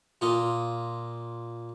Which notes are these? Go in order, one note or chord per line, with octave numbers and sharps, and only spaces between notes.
A#2 F4 D#5